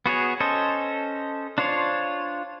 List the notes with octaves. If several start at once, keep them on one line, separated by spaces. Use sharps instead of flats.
B3 F#4 G#4 C#5
C#4 A4 C5 D#5
D4 F4 C5 C#5